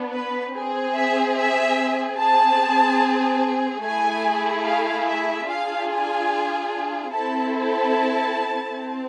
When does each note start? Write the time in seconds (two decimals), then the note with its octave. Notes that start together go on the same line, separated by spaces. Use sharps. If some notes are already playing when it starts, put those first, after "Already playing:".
Already playing: B3 D4
0.12 B4
0.53 C4 G#4
0.94 E5
1.35 E5
2.17 C4 G#4 A5
3.83 A3 E4 G#4 G#5
4.65 F5
5.06 E5
5.47 D4 F4 G#4 F5
5.89 G#5
7.13 C4 E4 A4 A5
7.54 A5
8.78 C4